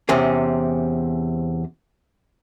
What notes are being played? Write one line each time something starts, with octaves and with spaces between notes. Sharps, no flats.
E2 C3 C4 C#4